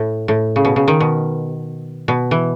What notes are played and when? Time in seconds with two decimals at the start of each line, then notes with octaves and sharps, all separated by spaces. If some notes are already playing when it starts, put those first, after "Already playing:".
Already playing: A2
0.28 A2
0.56 C#3
0.65 B2
0.76 C#3
0.88 D#3
1.00 B2
2.08 B2
2.31 E3